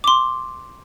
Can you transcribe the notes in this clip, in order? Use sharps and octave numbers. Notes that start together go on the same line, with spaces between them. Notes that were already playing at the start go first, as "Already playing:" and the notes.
C6 D6